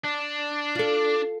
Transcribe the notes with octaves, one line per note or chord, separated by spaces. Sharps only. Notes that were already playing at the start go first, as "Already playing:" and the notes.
D4
F4 A4